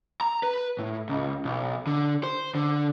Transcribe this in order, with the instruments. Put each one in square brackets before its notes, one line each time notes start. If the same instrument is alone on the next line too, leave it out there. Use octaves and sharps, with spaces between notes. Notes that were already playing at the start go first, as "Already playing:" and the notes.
[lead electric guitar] A#5
B4
A2
C#2
B1
D3
C5
D3